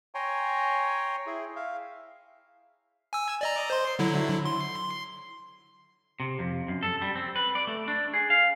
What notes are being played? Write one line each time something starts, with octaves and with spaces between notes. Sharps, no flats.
C#5 G5 G#5 A#5 C6 C#6
E4 G#4
E5 F5
G#5 E6
D5 D#5 A#5
C5 C6
D3 F#3 E4
C6
C3
F2
F#2
A4
G3
C4
B4
D5
A3
D4
G#4
F5